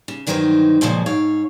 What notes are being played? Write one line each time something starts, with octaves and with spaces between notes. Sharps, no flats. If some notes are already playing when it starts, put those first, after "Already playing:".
C#3
G2 D#3 E3 F#3 D#4 C5
F2 A#2 C#3 F3 F#3 G#3
G#2 C#5 F5